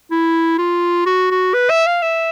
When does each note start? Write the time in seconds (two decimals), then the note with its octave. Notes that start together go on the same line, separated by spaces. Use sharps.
0.11 E4
0.58 F4
1.06 F#4
1.31 F#4
1.54 B4
1.70 E5
1.87 F5
2.02 E5